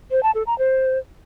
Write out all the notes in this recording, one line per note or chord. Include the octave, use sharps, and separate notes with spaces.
C5
A5
A4
A#5
C5